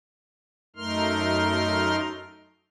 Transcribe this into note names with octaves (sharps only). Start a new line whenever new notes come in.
F#2 A3 D#4 A#4 C6 F6